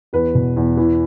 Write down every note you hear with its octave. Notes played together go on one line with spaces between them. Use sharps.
E2 B4
B2
E2
E3